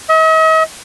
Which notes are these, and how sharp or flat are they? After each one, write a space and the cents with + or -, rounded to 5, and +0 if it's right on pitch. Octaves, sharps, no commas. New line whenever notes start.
D#5 +45